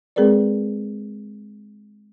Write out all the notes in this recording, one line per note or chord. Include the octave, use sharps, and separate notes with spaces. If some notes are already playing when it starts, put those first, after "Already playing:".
G#3 C4 G#4 A#4 B4 D5